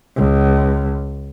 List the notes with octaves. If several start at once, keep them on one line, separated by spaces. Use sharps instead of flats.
C#2